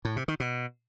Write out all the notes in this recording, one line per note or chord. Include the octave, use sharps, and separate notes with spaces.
A2
C3
D#3
B2